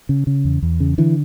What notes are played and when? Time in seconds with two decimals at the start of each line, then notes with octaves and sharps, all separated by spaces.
0.09 C#3
0.27 C#3
0.45 E2
0.62 E2
0.80 C#3
0.98 D3 E3